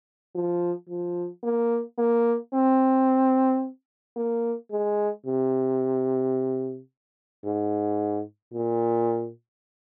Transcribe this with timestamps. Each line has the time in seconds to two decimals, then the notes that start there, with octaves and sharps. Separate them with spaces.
0.35 F3
0.89 F3
1.44 A#3
1.98 A#3
2.53 C4
4.17 A#3
4.71 G#3
5.26 C3
7.45 G#2
8.54 A#2